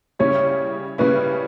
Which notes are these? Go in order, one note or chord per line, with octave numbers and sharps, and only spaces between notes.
C#3 G3 A#3 C#4 E4 C#5
C#3 G3 A#3 C#4 E4 B4